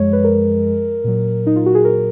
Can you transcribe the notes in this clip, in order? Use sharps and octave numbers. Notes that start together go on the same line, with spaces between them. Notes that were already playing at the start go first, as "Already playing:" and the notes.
Already playing: F#2 F3 G#3 C#5
B4
A#4
A#2 F#3
D#4
F4
F#4
G#4
A#4